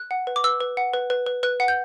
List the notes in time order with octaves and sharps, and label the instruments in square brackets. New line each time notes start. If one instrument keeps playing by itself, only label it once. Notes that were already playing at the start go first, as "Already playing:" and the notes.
Already playing: [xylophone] F#6
F#5
B4
D6
B4 E6
B4
F#5
B4
B4
B4
B4 F#6
F#5
G6